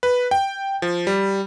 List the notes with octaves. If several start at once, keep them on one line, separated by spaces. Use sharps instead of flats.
B4
G5
F3
G3